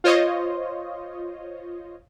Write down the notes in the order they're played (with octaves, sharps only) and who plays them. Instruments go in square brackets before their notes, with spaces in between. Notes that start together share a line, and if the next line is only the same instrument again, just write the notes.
[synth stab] F4 C5 C#5 D#5